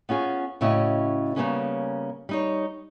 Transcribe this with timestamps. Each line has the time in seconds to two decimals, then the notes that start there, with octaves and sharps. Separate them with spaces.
0.09 B3 C#4 F4 G#4
0.61 A2 C#3 C#4 E4 F#4 D#5
1.36 C#3 F#3 G3 A#3 B3 C#4
2.29 G3 D#4 C#5